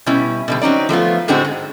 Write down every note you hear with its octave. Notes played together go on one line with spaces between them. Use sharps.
B2 G3 C#4 E4
B2 D3 G3
F#3 C4 C#4 D#4 D5
F3 A3 B3 F4
A2 D3 G#3 C4 D4 F#4
G#2